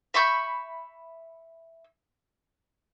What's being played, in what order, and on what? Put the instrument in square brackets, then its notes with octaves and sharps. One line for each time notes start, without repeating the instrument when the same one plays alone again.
[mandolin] E5 B5 C#6 G6